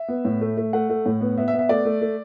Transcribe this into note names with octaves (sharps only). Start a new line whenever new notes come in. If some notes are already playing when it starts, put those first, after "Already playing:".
Already playing: E5
B3
A2
A3
A3
A3 F#5
A3
A2
B3
B3 E5
E5
B3
E5
A3 D5
A3
A3